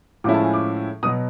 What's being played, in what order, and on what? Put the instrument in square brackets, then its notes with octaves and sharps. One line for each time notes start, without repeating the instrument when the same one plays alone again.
[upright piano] A2 F3 G#3 C#4 E4 D6
A5
G#5
D6
B2 F#3 B3 D#6